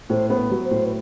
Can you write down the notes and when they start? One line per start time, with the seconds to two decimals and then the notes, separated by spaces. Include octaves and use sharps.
0.10 A2 C5
0.30 B3 C5
0.37 B4
0.51 F#3
0.65 C5
0.71 A2
0.85 B4